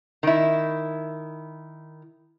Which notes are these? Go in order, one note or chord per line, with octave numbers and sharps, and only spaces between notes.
D#3 E4